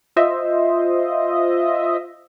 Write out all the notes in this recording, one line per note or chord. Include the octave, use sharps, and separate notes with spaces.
F4 C5 D#5 E5